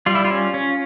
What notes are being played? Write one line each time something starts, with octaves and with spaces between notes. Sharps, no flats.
G3 F4
E4
F4
C#4
C#4